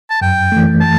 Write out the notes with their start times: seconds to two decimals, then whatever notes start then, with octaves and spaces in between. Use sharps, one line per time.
0.10 A5
0.21 F#2 G5
0.52 E3 A3
0.81 A5